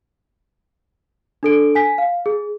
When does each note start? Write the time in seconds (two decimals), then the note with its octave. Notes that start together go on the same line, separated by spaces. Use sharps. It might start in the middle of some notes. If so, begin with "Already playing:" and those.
1.43 D4 A4 D7
1.75 G#5 B6
1.98 F5
2.26 G#4